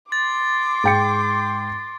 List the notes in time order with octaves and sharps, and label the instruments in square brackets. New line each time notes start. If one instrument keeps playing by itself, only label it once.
[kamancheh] C6 D6 [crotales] A6
[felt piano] G#2 G5 C#7